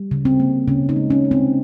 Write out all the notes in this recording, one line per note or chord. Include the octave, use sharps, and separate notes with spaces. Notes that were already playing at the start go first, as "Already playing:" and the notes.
Already playing: G3
C#3
C4
A#3
C#3 C#4
D#4
G#3
C#4
G#3
C4